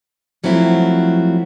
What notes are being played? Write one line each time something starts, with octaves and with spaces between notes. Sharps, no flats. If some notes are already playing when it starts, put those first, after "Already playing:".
F3 F#3 A3 C4 E4 F#4